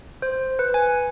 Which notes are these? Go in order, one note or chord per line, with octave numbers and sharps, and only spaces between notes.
C5
B4
G#5